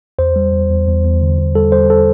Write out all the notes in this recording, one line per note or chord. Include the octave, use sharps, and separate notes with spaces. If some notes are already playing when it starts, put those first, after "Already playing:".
E2 C5
G3
E2
E2
E2
E2
D3
E2
G3 A4
G3 C5
A4